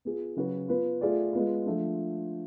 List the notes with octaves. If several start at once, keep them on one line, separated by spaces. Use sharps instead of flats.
B3 F4 G#4
C#3 F#3 C#4 F#4 B4
B3 F4 B4
A3 F4 G#4 D5
G#3 B3 F4
F3 A3 D4